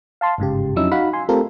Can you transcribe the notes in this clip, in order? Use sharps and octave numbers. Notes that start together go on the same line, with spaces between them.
F5 A5 C6
G1 G#2 C#3 G4
F2 F#3 C#4 D#4 E4 E6
D#4 F#4 F5 F#5 B5
G#5 C6
A3 C4 F4 G4 A4 A#4